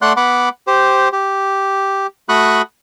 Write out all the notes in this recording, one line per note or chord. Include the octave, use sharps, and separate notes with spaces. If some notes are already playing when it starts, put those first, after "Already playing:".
A3 D5 F#5 C6 F#6
B3 F#5 B5 D6
G4 C5
G4
A3 F#4 B5 C#6 D#6 F#6